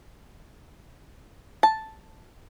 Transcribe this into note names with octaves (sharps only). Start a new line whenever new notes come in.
A5